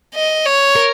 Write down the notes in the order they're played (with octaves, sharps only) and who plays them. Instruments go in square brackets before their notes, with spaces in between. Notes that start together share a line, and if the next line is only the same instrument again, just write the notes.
[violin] D#5
C#5
[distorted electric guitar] A#4